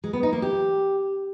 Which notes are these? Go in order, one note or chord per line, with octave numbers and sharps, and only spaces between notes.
G#3
B3
D#4
A#3
G4